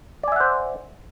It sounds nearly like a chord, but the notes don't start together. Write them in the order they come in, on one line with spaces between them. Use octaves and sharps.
D5 G#5 E5 F#5 C5